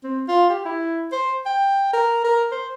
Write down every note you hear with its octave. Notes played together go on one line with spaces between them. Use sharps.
C4
F4
G4
E4
C5
G5
A#4
A#4
C5